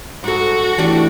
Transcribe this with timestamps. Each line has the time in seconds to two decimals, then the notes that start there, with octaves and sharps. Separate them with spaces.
0.24 G#2 F#4 A4
0.78 E3 G3 A3 D4